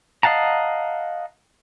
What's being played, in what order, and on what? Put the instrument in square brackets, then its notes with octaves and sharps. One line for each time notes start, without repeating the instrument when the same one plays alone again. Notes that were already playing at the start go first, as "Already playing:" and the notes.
[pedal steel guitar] D#5 F5 F#5 A5 A#5